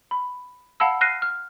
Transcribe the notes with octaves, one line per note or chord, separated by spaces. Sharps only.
B5
F5 F#5 A5 B5 E6
F6 F#6 A#6 C7 D#7
F6